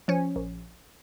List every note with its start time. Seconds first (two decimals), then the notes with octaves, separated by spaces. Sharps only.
0.08 F3 C#4 C#5
0.36 A#1